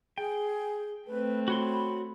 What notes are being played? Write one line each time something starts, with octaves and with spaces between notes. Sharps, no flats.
G#4 G5
A3 C4 B4
F#4 C#5 B5 C6